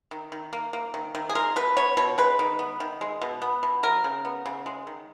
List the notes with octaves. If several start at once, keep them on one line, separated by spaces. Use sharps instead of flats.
D#3
D#3
A#3
A#3
D#3
D#3
G#4
G#3 A#4
B2 B4
B3 C#5
B2 C#5
G#3 B4
D#3
B3
D#3
G#3
B2
B3
B2
F#3 A#4
C#3
B3
C#3
G#3
D#3